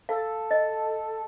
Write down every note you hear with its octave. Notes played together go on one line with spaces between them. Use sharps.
A4 F5
D#5